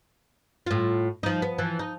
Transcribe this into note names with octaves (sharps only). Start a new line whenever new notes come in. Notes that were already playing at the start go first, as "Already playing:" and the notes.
A2 F4
F3 D#4
B3
E3 F3
D#4